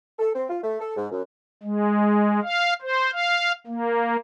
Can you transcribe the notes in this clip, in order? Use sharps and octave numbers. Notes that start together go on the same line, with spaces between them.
A4
C4
F4
A3
A4
G#2
F#2
G#3
F5
C5
F5
A#3